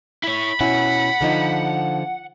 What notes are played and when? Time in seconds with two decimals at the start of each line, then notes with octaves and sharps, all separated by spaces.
0.24 E4 C#5 B5
0.60 B2 C#4 E4 F#5
1.21 D3 F3 D#4